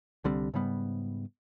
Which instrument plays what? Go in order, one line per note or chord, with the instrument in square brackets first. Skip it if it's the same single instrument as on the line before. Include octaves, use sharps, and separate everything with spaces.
[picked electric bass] C2 D3 G3 C4
G#2 C#3 G3 B3